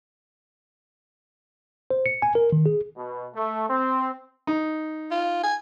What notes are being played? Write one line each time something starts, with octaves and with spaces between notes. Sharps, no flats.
C5
C#7
G#5
A#4
D#3
G#4
B2
A3
C4
D#4
F4
G#5